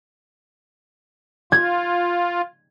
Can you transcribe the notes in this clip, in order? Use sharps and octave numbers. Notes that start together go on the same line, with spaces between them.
F4 G#6